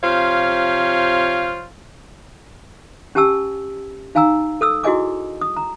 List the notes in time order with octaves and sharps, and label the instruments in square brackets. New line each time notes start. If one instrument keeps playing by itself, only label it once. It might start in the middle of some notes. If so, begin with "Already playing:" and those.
[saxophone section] C3 F3 F4 C5 C#5 F5
[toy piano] C#4 G4 G#5 A5 E6
D#4 F5 G#5 A#5 E6
A4 D#6 E6
E4 F#4 G#4 D#5 G#5 D6
D#6
A#5